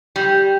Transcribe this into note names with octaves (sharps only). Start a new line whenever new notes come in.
G3